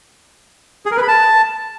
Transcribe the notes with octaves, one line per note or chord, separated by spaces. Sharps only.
G#4
A#4
B4
B5
A5